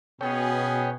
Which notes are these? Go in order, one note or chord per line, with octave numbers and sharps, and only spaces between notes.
B2 B3 C#4 G#4 C#5 G5